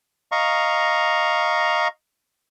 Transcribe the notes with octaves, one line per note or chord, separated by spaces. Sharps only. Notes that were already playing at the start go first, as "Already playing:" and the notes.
D#5 F5 A#5 C#6